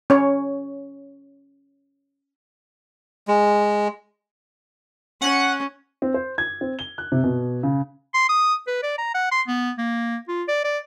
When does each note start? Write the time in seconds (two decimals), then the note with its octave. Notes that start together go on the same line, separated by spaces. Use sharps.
0.10 C#4 C#5
3.28 G#3
5.22 C#4 F#5
6.02 C4
6.14 C5
6.38 G#6
6.61 C4
6.79 G7
6.98 F#6
7.12 C3
7.24 B2
7.63 C#3
8.14 C6
8.29 D#6
8.67 B4
8.83 D5
8.98 A#5
9.15 F#5
9.31 C6
9.47 B3
9.78 A#3
10.28 F4
10.48 D5
10.64 D5